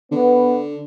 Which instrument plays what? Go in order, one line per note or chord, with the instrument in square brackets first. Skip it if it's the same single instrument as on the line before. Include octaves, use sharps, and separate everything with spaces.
[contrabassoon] D3 [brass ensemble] B3